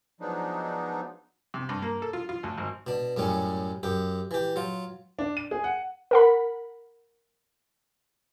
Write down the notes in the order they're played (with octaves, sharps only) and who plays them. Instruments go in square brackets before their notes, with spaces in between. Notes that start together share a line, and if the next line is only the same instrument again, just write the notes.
[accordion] F3 F#3 G#3 B3 D4 D#4
[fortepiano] C3
G2
A#3
A4
F4
F4
D2
G#1
[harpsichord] B2 D4
F#2 A2 G3 C#4
F#2 G4
E3 G4
F#3 F4
[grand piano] D4
D#7
G#4
F#5
[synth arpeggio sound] A#4 F#5 B5